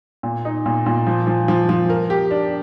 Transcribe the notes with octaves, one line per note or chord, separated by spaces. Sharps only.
A#2
D#4
A#2
A#2
F3
F3
F3
F3
A#4
G4
D4